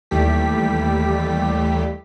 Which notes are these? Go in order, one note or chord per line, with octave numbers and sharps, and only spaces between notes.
D#2 E3 G3 A3 G4 B6